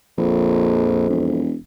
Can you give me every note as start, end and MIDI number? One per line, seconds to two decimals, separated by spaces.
0.18 1.09 34
0.18 1.41 41
1.10 1.55 28